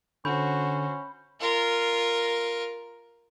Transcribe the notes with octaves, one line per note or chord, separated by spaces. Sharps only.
D3 C#4 F#4 C5 B5 G6
F4 A#4